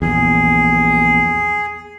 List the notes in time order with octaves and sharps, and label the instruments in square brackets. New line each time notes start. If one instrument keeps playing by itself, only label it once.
[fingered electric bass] A#1 E2 [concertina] G#4